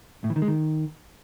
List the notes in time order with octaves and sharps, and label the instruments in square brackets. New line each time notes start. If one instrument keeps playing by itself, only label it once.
[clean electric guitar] A2
E3
D#3
G#3
D#3